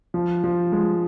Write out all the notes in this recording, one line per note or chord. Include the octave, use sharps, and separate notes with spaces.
F3
F3
G#3